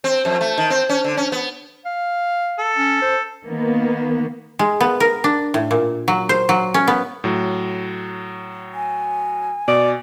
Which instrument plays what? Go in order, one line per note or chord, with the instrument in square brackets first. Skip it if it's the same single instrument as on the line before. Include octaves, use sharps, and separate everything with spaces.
[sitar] C4
F2
A3
D#3
C4
C#4
D3
C#4
B3
[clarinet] F5
[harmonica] A4
[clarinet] C#4
C5
[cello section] D#3 A#3 B3
[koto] G#3
B3
A#4
D4
A2
A#2
F#3
C5
F#3
C#4
B3
[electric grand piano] A2 F#3
[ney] G#5
[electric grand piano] B2 [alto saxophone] D5